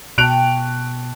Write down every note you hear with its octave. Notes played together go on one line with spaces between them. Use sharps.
B2 G5 A5 C#6 F#6 D7 F7